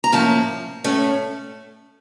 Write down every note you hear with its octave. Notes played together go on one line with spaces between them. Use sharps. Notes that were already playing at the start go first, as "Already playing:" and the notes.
A#5
A2 F3 A#3 C#4 A5
A2 A3 C#4